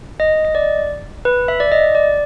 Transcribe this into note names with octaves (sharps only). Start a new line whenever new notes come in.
D#5
D#5
D5
B4
E5
D5
D#5
D5